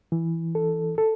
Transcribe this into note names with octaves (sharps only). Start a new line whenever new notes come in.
E3
A4
A4